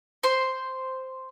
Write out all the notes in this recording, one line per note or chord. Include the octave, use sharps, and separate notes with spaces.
C5 C6